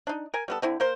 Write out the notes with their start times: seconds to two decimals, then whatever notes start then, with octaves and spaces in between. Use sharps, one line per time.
0.07 D4 D#4
0.34 A#4 G#5
0.48 G3 B3 A4
0.62 D3 C4 E4
0.80 A#3 A#4 C5